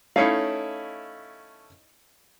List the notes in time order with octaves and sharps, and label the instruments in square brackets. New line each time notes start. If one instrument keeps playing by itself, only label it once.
[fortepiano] A3 C#4 E4 [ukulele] D#4 C#5 F5